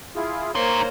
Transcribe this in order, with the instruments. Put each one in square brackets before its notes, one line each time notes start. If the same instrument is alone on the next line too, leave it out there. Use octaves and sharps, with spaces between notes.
[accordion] E4 F4 G#4
[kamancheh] A#3 C5 [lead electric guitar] D#4 C6 [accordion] C#5 A#5